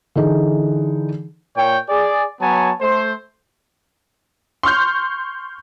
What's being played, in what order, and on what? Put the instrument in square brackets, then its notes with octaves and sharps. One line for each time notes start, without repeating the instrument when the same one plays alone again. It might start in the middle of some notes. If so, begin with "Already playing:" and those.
[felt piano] D3 E3 D#4 G#4
[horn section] A#2 C#5 G5
G#4 D5
F#3 B3 C#5 G#5 A5
A3 C5
[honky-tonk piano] C6 C#6 F6 G6